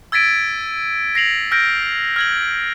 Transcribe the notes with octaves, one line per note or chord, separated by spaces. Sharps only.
E6 G#6 A6 B6 D7 D#7
A#6 C7 F7 F#7
E6 F6 G6 A#6 D7
F6 G#6 F#7